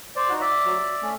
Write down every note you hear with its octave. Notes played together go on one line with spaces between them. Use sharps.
C5 D5
D#4 F#4
D5 E5
F#3
A3 C#4